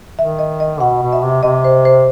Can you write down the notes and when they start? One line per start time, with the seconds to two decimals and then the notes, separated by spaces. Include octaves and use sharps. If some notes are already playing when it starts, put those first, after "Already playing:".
0.18 D#3 E5
0.39 D#5
0.60 D#5
0.80 B2 F#5
1.02 B2
1.13 E5
1.23 C3
1.43 C3 D#5
1.64 C5
1.85 C5